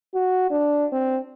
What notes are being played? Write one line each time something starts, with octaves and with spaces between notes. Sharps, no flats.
F#4
D4
C4